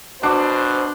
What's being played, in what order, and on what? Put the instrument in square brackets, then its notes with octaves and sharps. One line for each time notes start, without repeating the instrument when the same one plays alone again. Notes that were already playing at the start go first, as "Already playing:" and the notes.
[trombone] B2 [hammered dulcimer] D4 [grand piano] F#4 D6 [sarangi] C5